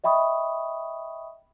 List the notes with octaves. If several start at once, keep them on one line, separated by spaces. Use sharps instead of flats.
D#5 E5 G5 B5 C#6 D#6